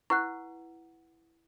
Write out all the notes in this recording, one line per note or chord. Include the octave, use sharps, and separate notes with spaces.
E4 B4 F#5 C#6 F#6